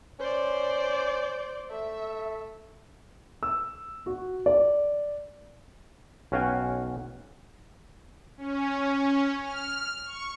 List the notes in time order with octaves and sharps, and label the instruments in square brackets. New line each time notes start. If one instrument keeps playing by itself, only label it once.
[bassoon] C#4 [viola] C5 D5
[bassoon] A3 [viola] E5
[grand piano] E6
F#4
D5
[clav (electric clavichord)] B1 C#4 F#4 F5 G5 G#5
[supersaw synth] C#4
F6
C#6